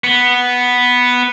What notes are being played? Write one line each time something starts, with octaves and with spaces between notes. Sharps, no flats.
B3